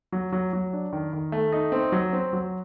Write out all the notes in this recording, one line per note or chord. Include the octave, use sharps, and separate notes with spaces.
F#3
F#3
F#3
D4
D#3
D#3
A3
D#4
C4
F#3
C4
F#3